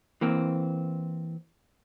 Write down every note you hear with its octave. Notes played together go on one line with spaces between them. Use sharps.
E3 A#3 C4